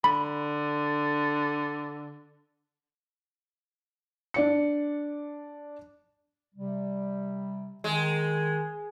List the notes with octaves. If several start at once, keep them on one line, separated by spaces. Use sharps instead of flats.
D3 B5
D4 D5 C#7
C3 G3
D#3 G#3